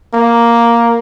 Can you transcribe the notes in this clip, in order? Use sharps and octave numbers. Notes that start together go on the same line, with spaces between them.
A#3